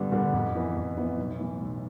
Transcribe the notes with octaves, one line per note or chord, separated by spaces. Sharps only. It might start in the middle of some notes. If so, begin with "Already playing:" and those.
Already playing: G2 D3 G3 B3 D4
D3 G3 B3 D4
F2
E3 B3 E4
F2
E3 B3 E4
B1
A2 E3 B3
B1